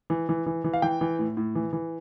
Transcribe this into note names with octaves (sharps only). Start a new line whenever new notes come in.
E3
E3
E3
E3
F5
E3 G5
E3
A2
A2
E3
E3